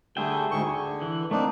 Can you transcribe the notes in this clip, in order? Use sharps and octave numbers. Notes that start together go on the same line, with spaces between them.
D3 G3 A3 G#4 E5 G5
D2 G#2 C#6
D3
E3
A3 A#3 C4 D4 D#4